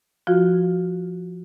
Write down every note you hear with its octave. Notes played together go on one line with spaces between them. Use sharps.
F3 F4 F#4